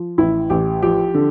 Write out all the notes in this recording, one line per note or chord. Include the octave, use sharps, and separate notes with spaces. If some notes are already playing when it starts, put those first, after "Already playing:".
Already playing: F3
A1 E4
A1 G4
F3 G4
D3